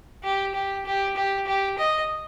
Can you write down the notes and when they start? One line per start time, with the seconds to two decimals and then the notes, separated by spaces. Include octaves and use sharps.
0.24 G4
0.55 G4
0.86 G4
1.16 G4
1.47 G4
1.78 D#5